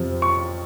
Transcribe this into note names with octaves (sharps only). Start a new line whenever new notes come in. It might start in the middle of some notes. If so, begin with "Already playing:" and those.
Already playing: F2 C3 F3
C#6